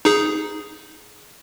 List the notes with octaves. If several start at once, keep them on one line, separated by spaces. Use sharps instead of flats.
D#4 G#4